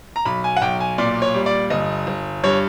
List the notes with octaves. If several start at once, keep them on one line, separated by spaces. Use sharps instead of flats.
A#5
B1 B5
G#5
F#5
B1 G5
G#5
A#2 D5
C#5
G3
D5
G1 D#5
G1
G2 C#5